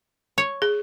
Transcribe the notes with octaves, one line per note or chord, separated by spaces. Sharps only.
C#5
G#4